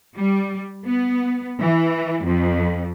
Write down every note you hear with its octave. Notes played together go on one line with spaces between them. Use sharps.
G3
B3
E3
F2